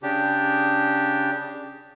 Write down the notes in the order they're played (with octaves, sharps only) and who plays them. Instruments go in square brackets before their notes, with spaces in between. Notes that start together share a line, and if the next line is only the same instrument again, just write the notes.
[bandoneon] C#3 D4 G4